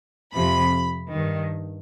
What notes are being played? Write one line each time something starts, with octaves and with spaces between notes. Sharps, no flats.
F2 C3 F3 B5
G2 D#3